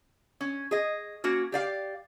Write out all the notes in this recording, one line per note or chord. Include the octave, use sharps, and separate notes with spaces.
C#4
G#4 D#5
A#3 C#4 F#4
G4 D5 F5